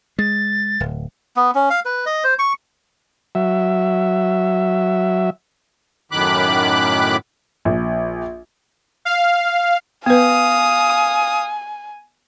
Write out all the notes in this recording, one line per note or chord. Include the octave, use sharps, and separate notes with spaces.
G#3 A6
D1
B3
C#4
F5
B4
D#5
C5
C#6
F#3 E5
F#2 A2 D#3 B5 D6 F#6
A#1
F5
B3 B4 F5 G#5 D#6